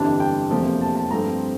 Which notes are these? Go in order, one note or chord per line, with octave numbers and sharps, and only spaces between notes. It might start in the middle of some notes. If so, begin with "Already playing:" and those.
Already playing: G1 F2 E3 G3 D4 A5
G5
F1 E2 C3 F3 A#3
A5
A5
G2 F3 A3 C4 A#5